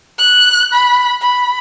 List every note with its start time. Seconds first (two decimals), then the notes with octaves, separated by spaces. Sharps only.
0.19 F#6
0.73 B5
1.22 B5